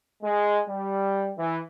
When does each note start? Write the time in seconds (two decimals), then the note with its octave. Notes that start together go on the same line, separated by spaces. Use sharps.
0.23 G#3
0.68 G3
1.37 E3